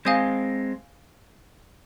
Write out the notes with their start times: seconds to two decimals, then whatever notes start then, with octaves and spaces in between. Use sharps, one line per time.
0.05 G#3 C4 F5 G#5 D#6 G6